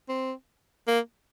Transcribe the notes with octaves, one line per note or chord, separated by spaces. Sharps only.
C4
A#3